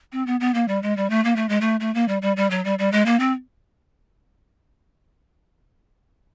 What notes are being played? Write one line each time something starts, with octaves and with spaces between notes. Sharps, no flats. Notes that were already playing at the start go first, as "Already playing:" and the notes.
C4
B3
B3
A#3
G3
G#3
G3
A3
A#3
A3
G#3
A3
A3
A#3
G3
G3
G3
F#3
G3
G3
G#3
A#3
C4